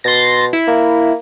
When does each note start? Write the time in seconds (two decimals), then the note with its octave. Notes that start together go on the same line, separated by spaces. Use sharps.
0.04 B2 C6 A6 A#6
0.53 E4
0.67 A#3